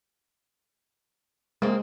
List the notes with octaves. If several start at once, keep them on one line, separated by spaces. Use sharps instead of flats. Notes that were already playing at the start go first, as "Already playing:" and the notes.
G#3 A#3 C4